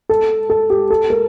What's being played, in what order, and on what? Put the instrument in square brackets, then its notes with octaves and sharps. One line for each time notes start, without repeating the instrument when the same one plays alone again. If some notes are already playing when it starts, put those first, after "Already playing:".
[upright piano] A4
A4
G4
A4
A#4